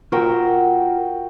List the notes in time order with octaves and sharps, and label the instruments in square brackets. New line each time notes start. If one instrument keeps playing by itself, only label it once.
[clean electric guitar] F4 A#4 [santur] F#4 G5 E6